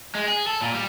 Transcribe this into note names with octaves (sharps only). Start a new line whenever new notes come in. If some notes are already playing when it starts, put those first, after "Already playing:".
G#3
G#4
A4
A#2
G3